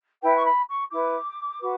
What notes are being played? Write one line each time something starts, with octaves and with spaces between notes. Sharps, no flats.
E4 B4 G5
C#6
B5
C#6
E4 B4 D6
F#4 B4